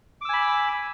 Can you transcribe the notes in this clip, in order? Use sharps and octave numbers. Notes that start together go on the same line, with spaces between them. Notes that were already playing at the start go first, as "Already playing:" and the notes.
G#5 B5 D6 E6